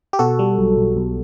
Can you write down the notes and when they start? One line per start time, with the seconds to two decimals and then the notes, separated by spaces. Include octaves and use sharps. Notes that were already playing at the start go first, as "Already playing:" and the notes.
0.13 G4
0.19 B2 F#4 A4
0.39 G3
0.59 B1
0.77 B1
0.97 B1